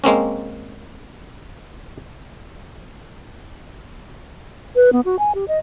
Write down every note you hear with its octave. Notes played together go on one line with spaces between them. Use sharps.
G#3 A#3 C4 C#4
B4
B3
F#4
G#5
G4
D#5